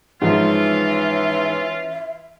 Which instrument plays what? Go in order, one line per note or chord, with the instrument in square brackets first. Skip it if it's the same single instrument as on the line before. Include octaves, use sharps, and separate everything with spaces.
[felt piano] G#2 F3 [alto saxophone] E3 [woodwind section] C#4 F4 [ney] E5